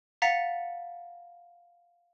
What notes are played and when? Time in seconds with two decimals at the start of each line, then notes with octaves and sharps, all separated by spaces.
0.22 F5 F#5 A#5 A6 B6 C#7